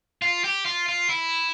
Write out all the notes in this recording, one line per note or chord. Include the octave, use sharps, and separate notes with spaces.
F4
G4
F4
F4
E4